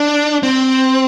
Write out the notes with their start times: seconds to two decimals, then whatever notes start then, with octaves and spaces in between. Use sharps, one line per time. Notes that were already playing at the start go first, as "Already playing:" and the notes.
Already playing: D4
0.43 C4